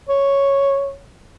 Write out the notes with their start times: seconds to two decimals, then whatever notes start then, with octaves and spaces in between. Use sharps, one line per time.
0.09 C#5